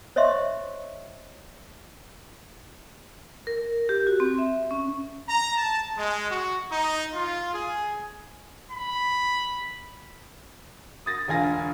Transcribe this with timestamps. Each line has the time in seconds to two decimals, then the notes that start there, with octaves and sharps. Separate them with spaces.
0.16 C5 C#5 D#5 E5 C6 C#6
3.47 A#4
3.89 G4
4.07 F#4
4.20 C4
4.38 E5
4.71 C#4
5.28 A#5
5.56 A5
5.97 G#3
6.29 F#4
6.71 D#4
7.13 F4
7.53 G#4
8.71 B5
11.06 D#6 A6 A#6
11.28 E1 D2 F4 G#5 A6 A#6